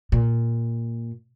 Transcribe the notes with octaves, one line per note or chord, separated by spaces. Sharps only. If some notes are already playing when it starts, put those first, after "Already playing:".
A#2